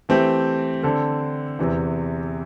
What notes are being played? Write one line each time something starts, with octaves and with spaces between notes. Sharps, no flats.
E3 A3 C4 G4
D3 C4 A4
E2 C3 E3